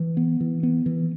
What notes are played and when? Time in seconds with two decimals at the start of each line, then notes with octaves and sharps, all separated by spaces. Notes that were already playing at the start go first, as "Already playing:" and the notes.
Already playing: E3
0.17 B3
0.40 E3
0.63 B3
0.86 E3